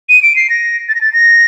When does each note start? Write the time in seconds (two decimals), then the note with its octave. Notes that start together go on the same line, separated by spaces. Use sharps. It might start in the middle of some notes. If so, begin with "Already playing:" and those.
0.09 D#7
0.23 D7
0.36 C7
0.50 A#6
0.89 A6
0.95 A#6
1.01 A6
1.13 A#6